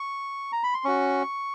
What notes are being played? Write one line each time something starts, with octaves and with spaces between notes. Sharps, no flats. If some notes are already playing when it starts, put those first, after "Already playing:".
Already playing: C#6
A#5
B5
C6
C#4 F#4 C#6